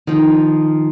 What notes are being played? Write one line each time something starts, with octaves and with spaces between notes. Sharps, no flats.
D#3 F3